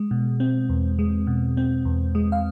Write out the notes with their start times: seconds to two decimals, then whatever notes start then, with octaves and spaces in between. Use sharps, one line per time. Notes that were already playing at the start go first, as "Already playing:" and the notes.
Already playing: G#3
0.11 B2
0.40 C4
0.69 E2
0.99 G#3
1.27 B2
1.57 C4
1.85 E2
2.15 G#3
2.32 F5